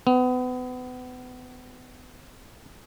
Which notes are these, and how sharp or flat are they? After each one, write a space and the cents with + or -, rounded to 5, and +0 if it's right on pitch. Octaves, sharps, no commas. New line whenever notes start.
B3 +30